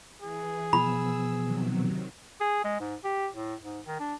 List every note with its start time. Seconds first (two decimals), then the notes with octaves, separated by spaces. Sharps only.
0.22 E3 G#4
0.73 B2 F3 B3 B5 E6
1.44 C3 D#3 F#3
2.41 G#4
2.64 G#3
2.81 G#2
3.04 G4
3.34 A2
3.63 G#2
3.87 D#3
4.00 D4